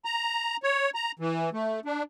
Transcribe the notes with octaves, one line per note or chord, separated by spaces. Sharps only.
A#5
C#5
A#5
E3
A3
D4